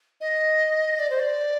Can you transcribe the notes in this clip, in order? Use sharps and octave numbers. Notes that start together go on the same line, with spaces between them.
D#5
D5
C5
D5